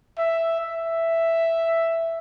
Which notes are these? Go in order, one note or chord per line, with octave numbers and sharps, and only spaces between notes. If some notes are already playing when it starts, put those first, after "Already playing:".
E5
E5